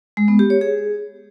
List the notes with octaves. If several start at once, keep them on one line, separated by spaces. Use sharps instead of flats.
G#3
B3
G4
C#5
G#4